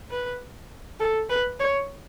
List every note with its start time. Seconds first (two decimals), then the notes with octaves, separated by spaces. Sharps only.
0.11 B4
1.00 A4
1.30 B4
1.59 C#5